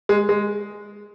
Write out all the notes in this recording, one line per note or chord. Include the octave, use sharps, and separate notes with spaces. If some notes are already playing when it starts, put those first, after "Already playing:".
G#3
G#3